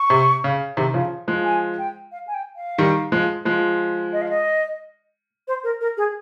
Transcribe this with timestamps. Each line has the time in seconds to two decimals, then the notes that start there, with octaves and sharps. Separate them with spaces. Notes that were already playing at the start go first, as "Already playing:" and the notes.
Already playing: C#6
0.10 C3
0.44 C#3
0.77 C3 D#3
0.94 C#3 F3
1.28 F3 G#3
1.44 G#5
1.78 G5
2.11 F5
2.27 G#5
2.34 G5
2.56 F5
2.78 D#3 G3
3.12 F3 G#3
3.45 F3 G#3
4.12 D#5
4.21 F5
4.29 D#5
5.47 C5
5.63 A#4
5.80 A#4
5.97 G#4